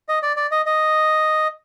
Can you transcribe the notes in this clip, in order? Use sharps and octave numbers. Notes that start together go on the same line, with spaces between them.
D#5
D5
D5
D#5
D#5